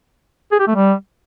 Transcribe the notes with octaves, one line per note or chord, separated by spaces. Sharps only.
G#4
G4
A3
G3